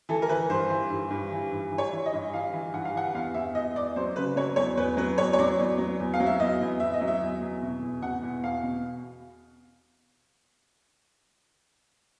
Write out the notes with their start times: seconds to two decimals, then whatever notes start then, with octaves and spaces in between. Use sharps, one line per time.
0.09 E3 A4
0.22 A#4
0.29 E3 B4
0.50 G2 C5
0.70 E3
0.90 G2
1.11 G2
1.32 E3
1.52 G2
1.72 E3
1.78 C#5
1.92 E3
2.06 D#5
2.13 G2
2.33 E3 F5
2.53 E3
2.73 G2 F#5
2.85 F5
2.94 E3 F#5
3.14 E2 F5
3.34 E2 E5
3.55 E2 D#5
3.76 E2 D5
3.96 F#3 C5
4.16 C#3 B4
4.36 F#3 C#5
4.56 E2 C#5
4.77 E2 B4
4.97 F#3 B4
5.18 E2 C#5
5.33 C#5
5.39 F#3 D5
5.58 E2
5.78 F#3
6.00 E2
6.14 F5
6.20 F#3
6.26 E5
6.40 E2 D#5
6.61 E2
6.80 E2 E5
6.94 D#5
7.01 F#3
7.08 E5
7.21 E2
7.42 E2
7.62 B2
7.82 E2
8.02 B2 F#5
8.23 E2
8.43 E2 F5
8.63 B2